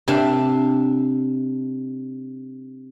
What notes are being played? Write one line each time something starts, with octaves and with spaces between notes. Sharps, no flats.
C3 D4 E5 F5